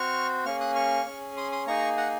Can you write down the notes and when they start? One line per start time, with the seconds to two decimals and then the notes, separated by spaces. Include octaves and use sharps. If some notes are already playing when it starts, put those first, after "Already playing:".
Already playing: C4 F#4 C#6 F6
0.45 A#3 C#4 G#4 C#6 F6
0.61 D#6 F#6
0.75 C#6 F6
1.06 C#4 G#4
1.37 C6 D#6
1.52 C6 D#6
1.67 A#3 D#4 G#4 A#5 C#6
1.97 F#5 A#5